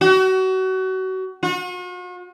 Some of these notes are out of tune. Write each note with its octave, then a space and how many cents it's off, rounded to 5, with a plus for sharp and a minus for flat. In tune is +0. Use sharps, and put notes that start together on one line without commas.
F#4 +30
F#4 -45